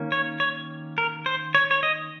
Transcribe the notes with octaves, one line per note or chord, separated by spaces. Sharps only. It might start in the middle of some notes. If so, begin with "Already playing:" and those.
Already playing: D#3 A#3 C#4
C#5
C#5
A#4
C5
C#5
C#5
D#5